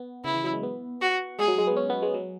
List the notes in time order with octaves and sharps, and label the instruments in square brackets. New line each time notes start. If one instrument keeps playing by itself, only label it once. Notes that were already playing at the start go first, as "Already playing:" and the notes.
Already playing: [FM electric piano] B3
[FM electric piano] C#3 [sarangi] E4
[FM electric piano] E3
F#3
G#3
B3
[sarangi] F#4
[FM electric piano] G#3 [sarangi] G#4
[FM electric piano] F#3
G#3
B3
C#4
B3
G#3
F#3